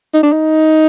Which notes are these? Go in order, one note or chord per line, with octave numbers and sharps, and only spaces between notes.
D#4
D4
D#4